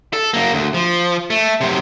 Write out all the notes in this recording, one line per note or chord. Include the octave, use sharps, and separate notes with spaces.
A4
F#2 A#3
D2
F3
A3
F#2 C3